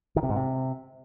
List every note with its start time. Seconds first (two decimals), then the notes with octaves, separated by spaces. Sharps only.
0.16 D#3
0.23 C3
0.29 G#2
0.36 C3